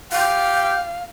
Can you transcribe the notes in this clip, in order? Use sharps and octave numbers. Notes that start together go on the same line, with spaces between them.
G4 F5 G5